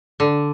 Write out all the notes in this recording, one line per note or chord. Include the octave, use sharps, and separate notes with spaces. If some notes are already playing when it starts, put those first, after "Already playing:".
D3